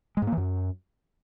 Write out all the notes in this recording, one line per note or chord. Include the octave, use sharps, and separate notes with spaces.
G#3
G#2
A#3
E3
F#2